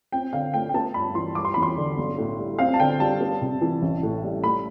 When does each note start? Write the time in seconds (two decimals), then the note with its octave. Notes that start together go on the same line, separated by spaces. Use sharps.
0.12 C4 G5
0.33 D3 F5
0.53 A3 G5
0.69 G5
0.74 B3 A5
0.94 G2 B5
1.15 E3 C6
1.35 G3 D6
1.45 C6
1.54 E2 B5
1.63 C6
1.78 D3
1.97 B1
2.18 A2
2.39 G3
2.59 C4 F5
2.74 A5
2.80 D3 G5
3.00 G3 A5
3.21 B3
3.41 C3
3.61 E3
3.82 A1
4.03 A2
4.24 G3
4.43 A3 B5